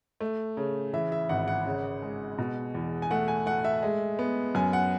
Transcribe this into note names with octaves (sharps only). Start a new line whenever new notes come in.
A3
C#3
E3 E5
E5
G#1 F#5
F#5
C#3
G#3
B2
E2
G#5
A3 F#5
G#5
A3 F#5
E5
G#3
B3
F#2 G#5
F#5